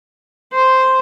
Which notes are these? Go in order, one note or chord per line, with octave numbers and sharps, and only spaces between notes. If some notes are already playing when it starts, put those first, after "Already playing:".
C5